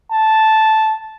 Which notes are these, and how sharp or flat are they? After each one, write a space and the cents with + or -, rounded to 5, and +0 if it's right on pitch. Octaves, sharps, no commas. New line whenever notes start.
A5 -5